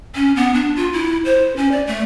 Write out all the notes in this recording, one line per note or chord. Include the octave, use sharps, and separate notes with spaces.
C#4
B3
D4
F4
E4
C5
C#4
D5
A3